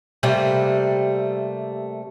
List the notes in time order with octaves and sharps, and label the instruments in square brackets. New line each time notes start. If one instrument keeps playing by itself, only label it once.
[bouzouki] C3 G3 A3 A#3